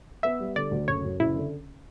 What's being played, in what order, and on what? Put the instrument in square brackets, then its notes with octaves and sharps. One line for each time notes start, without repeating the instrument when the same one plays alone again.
[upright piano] B3 [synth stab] E5
[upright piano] G3
[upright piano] D3 [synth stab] D5
[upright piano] D2
[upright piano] F#1 [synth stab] C#5
[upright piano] F#2
[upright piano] F#1 [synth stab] E4
[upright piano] D3